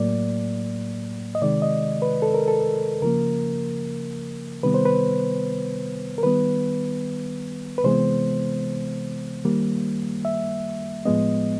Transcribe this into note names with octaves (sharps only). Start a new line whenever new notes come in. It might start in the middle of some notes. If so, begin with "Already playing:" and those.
Already playing: A2 F#3 A#3 D5
D#5
C3 D#3 G#3 D5
D#5
B4
A4
A#4
A4
C#3 F3 A#3 A#4
C3 D#3 G3 B3 B4
C5
B4
A#4
D#3 G3 B3 B4
B4
C3 E3 G#3 B3 C5
D#3 G3 A#3
E5
A2 F3 G#3 B3 D#5